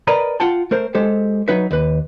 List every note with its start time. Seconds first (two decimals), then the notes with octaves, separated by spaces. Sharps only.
0.07 A#4 B4 D5 D#5 A#5 B5
0.40 F4 F#5 G5 A5
0.71 A3 A#4 C5
0.95 G#3 G4 A4 C5
1.48 F#3 D#4 B4 E5
1.71 D#2 B4